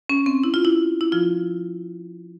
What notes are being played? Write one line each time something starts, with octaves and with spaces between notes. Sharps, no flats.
C#4
C4
E4
F4
E4
E4
F3 F4